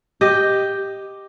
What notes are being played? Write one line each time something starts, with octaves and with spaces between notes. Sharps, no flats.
G4 D#5